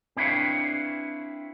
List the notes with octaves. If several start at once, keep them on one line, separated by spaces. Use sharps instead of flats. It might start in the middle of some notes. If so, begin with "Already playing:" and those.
C4 D4 E4 B4 C#5 F5